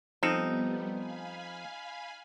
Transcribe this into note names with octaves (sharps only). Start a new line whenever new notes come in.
F3 G3 B3 C4 D#4 A4
F5 G#5 B5